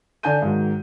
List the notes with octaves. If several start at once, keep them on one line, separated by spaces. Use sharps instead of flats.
D3 D4 G#5 A5 G6 D#7
G#2 D#3 F#3